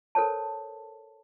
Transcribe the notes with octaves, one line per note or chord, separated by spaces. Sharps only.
A4 A#4 C5 C#5 A5